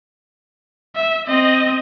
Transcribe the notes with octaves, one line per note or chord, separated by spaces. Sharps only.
E5
C4 D#5